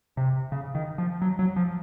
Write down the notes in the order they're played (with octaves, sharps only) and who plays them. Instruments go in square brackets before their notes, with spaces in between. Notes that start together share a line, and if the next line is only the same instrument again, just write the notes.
[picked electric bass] C3
C#3
D#3
F3
F#3
F#3
F3